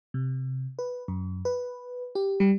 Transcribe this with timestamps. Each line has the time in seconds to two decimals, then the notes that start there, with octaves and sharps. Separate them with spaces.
0.14 C3
0.79 B4
1.08 F#2
1.45 B4
2.15 G4
2.40 G3